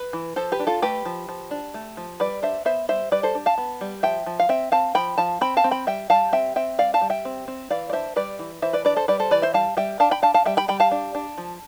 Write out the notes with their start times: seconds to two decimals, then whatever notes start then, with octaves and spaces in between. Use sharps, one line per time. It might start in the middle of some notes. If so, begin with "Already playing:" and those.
Already playing: B4
0.13 E3
0.36 F3 A4 C5
0.52 G4 B4
0.59 D4
0.67 F4 A4
0.82 A3 G4 B4
1.05 F3
1.29 F3
1.51 D4
1.74 A3
1.97 F3
2.20 G3 B4 D5
2.43 D4 C5 E5
2.65 B3 C5 E5
2.89 G3 C5 E5
3.11 G3 B4 D5
3.23 A4 C5
3.35 D4
3.46 F5 A5
3.58 B3
3.81 G3
4.03 F3 E5 G5
4.26 F3
4.40 F5
4.49 C4 E5 G5
4.72 C4 F5 A5
4.95 F3 G5 B5
5.18 F3 F5 A5
5.41 C4 G5 B5
5.57 F5 A5
5.64 C4
5.71 G5 B5
5.87 G3 E5 G5
6.10 G3 F5 A5
6.32 C4 E5 G5
6.56 C4 E5 G5
6.79 G3 D5 F5
6.94 F5 A5
7.01 G3
7.10 E5 G5
7.25 C4
7.48 C4
7.70 E3 D5 F5
7.90 D5
7.93 D4 C5 E5
8.16 G3 B4 D5
8.39 E3
8.62 E3 C5 E5
8.73 B4 D5
8.85 D4 B4 D5
8.96 A4 C5
9.08 G3 B4 D5
9.20 A4 C5
9.31 E3 B4 D5
9.42 C5 E5
9.54 G3 F5 A5
9.77 G3 E5 G5
10.00 D4 F5 A5
10.11 G5 B5
10.22 D4 F5 A5
10.34 F5 A5
10.45 G3 E5 G5
10.57 G5 B5
10.68 G3 G5 B5
10.80 F5 A5
10.91 D4
11.15 D4
11.38 F3